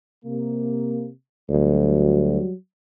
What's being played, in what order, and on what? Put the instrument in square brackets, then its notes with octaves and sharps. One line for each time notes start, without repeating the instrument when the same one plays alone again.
[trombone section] C3 A#3
[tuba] D2 [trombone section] F#3 G3